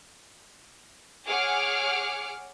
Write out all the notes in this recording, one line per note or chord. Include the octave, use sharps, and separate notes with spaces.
G#4 C#5 F#5 D6 F6